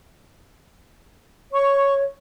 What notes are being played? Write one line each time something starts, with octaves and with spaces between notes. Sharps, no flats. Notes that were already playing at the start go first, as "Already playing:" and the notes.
C#5 C#6